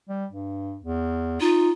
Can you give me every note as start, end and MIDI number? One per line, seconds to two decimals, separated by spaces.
0.09 0.26 55
0.31 0.77 43
0.83 1.37 40
1.41 1.69 63
1.41 1.70 65